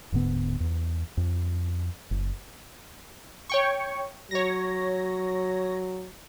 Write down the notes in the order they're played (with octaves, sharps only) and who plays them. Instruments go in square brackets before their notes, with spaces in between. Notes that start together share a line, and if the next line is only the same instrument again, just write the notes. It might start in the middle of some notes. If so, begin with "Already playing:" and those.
[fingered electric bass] D1 G#2 D3 B3
E2
F2
F#1
[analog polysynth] C#5 G5 C#6
[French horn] F#3 [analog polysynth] C#5 A#6